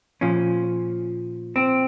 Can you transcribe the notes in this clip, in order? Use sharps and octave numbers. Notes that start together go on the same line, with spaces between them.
A#2 F3 C#4
C4